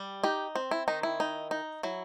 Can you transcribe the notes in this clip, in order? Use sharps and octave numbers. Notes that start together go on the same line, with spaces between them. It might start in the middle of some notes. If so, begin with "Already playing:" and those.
Already playing: G3
D#4 G4
C4
E4
D#3 D#4
E4
D#4
D#4
F#3 E4